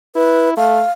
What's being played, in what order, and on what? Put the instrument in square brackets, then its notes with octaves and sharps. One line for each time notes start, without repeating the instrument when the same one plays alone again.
[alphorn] E4 [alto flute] B4
[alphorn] A3 [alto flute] F5